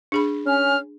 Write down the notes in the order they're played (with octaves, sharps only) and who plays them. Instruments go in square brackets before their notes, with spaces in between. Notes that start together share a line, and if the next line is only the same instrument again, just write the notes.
[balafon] D4 G#4 B5
[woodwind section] C#4 [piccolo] F6